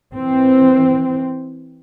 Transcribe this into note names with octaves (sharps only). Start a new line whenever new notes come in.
E3 C4